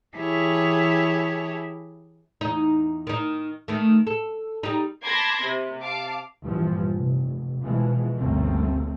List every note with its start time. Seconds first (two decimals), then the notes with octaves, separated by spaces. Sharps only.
0.17 E3 E4 G4 G#4 C#5 A5
2.41 E2 D#4
3.07 D#3 D#4
3.68 D#3 A3
4.07 A4
4.63 G3 D#4
5.05 A5 B5 C6 D6 G#6 A#6
5.42 C3
5.82 F5 A5 D6
6.43 A#1 G2 E3 F3
6.96 F1
7.62 B2 E3 F3 G#3
8.18 G1 D2 C#3 A3 A#3 C4